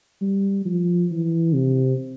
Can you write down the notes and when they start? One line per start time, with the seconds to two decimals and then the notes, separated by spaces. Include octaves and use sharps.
0.21 G3
0.65 F3
1.11 E3
1.54 C3